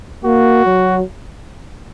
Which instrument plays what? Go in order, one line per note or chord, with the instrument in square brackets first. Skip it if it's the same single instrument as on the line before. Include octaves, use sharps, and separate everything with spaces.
[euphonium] A#3 [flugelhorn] F#4
[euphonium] F#3